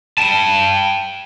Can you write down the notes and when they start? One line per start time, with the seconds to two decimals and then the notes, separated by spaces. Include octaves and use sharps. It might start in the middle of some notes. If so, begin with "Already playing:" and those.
0.18 G5 A5